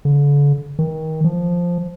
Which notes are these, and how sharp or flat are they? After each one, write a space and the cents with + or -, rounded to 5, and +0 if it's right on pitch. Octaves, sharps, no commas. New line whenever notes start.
D3 -40
D#3 +25
F3 +0